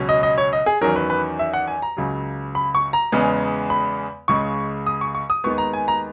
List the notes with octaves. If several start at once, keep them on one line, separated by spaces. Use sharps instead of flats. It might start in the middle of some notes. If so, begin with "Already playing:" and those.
Already playing: C#2 B2 F#3 C#4
D#5
D#5
C#5
D#5
G#4
E2 D#3 F#3 C#4 A#4
B4
B4
E5
F#5
G#5
A#5
C#2 C#3 F#3
B5
C#6
A#5
E2 C#3 G#3 B3
B5
C#2 C#3 G#3 C#6
D#6
C#6
C#6
D#6
D#2 D#3 G#3 B3 C#6
A#5
G#5
A#5